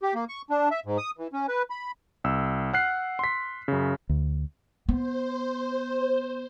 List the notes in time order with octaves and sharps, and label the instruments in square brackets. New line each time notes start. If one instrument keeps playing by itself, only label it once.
[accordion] G4
A#3
C#6
D4
E5
G#2
D#6
E3
C#4
B4
B5
[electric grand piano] C2 E6
F#5 F6 F#6 C7
C6 B6
F#2 C#3
[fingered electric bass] D2
[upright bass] B3 [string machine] C5